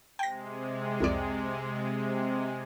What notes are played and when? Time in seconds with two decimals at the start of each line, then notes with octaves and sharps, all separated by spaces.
0.19 C3 G#3 G5 A#6
1.00 C2 F2 D5